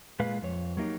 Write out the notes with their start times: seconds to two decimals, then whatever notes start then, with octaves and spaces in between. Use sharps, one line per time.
0.20 A#2 G#3 B4 F5
0.42 F2 C#5
0.77 F#3 A#3 D#4 G4